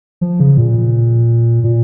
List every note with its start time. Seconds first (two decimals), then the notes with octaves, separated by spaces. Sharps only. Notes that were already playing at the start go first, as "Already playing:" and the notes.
0.21 F3
0.40 C#3
0.57 A#2
1.64 A#2